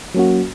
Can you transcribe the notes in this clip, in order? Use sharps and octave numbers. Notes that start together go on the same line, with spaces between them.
F#3 A#3 C#4 F#4